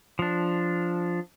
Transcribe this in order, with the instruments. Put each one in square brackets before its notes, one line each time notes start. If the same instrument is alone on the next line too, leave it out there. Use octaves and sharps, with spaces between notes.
[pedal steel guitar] F3 D4